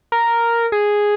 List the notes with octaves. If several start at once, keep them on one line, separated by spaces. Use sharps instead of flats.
A#4
G#4